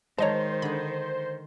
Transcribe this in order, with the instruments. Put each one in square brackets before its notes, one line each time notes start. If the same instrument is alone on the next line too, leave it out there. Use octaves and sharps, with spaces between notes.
[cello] D#3 [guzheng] G#3 A#5 [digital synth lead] C5 [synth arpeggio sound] C#5 D#5 A5
[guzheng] D3 G#4 [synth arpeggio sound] B5